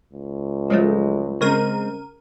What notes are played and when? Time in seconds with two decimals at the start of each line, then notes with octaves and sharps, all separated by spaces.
0.13 C#2
0.70 F3 F#3 G#3 A3
1.41 C#3 G#3 C4 A#4 D#7